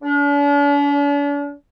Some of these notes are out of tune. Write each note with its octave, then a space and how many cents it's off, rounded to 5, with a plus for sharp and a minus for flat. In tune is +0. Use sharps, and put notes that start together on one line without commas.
D4 -45